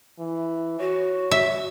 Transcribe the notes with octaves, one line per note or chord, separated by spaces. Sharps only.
E3
F#4 C#5
E5